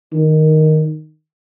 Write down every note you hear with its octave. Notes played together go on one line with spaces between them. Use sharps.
D#3